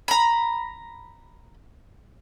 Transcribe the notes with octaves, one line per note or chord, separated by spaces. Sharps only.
A#5 B5